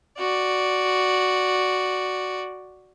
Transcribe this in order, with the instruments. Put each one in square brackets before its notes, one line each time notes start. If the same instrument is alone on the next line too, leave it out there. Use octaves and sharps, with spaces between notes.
[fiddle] F#4 D5